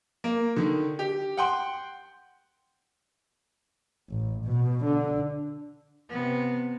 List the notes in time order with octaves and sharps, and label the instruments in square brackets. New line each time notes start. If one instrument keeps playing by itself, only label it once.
[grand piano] A#3
D3 D#3
G4
F#5 G5 C6
[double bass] A1
B2
D3
[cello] C3 B3